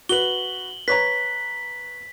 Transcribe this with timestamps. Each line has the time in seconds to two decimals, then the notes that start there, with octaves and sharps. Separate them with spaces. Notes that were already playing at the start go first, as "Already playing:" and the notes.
0.09 F#4 B4 F#7 G7
0.88 B4 C#5 A#5 B6